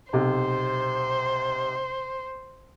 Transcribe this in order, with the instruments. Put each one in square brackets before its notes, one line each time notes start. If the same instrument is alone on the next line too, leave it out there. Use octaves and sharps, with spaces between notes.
[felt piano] B1 C3 [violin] C5